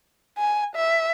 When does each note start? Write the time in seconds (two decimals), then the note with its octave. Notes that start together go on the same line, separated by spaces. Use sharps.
0.39 G#5
0.76 E5